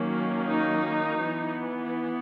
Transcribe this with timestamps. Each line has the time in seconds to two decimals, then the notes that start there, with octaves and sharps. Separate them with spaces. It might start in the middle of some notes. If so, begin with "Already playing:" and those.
Already playing: D#3 F#3 A#3 C#4
0.46 D#4
1.22 E3 B3